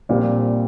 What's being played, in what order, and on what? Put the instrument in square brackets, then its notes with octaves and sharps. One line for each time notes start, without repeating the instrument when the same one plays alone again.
[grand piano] A#1 A#2 G3 C4